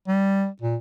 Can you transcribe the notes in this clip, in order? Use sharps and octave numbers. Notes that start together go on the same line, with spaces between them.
G3
A#2